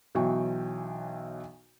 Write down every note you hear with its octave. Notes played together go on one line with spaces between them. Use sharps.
B1 E3 F#3 G5 C#6